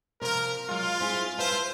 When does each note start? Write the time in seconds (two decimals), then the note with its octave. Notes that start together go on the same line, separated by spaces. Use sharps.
0.21 C3 F3 A#4
0.69 F#3 G#3 F4
1.00 C4 E4 G#4
1.37 F4 B4 C5 E5 A5